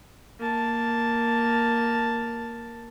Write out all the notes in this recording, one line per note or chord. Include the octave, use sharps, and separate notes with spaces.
A#3 A5